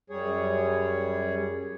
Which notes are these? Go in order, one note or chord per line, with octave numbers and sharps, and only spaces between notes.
F#2 G3 G#4 C#5